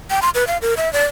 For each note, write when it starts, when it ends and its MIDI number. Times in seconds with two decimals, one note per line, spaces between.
0.10 0.20 79
0.22 0.30 84
0.35 0.47 71
0.47 0.58 77
0.62 0.74 70
0.77 0.91 76
0.93 1.05 74